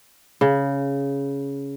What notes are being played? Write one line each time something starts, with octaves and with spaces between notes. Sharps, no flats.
C#3